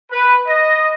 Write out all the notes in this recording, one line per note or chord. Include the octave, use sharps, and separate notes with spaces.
B4
D#5